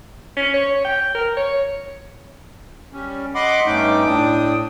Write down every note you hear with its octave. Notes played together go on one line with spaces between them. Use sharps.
C#4
C#5
G5
A#4
C#5
G3 C#4
D#5 F#5 B5 C6 D6
G2 A3 C#4 D#4 G5 D6
A2 D4 G5 D#6